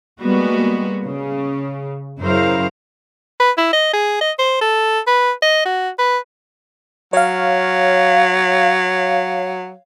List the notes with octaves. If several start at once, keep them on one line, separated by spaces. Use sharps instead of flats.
G3 G#3 A#3 B3 F#4
C#3
F#2 C#3 E4 A#4 C5 F5
B4
E4
D#5
G#4
D#5
C5
A4
B4
D#5
F#4
B4
F#3 C#5 F5